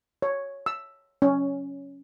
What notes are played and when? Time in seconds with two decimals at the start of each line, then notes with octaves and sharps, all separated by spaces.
0.22 C#5
0.66 E6
1.22 C#4